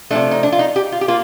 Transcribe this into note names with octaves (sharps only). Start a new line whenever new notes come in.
C3 F3 A3 D4
D#4
D4
F4
D#4
G4
F4
G4
A#3 F4